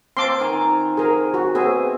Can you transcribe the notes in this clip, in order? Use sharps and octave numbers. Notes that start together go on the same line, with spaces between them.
C4 F4 A5 C6 D6
D#3 G#5 A#5
G#4 A#4
F#4
B3 C4 G#4 E5